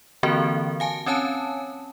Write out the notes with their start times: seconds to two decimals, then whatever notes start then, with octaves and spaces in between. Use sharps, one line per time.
0.23 D3 E3 A#3 C4 F#4 A#4
0.80 F5 G#5 A5
1.06 C4 C#4 C#5 G#5 A5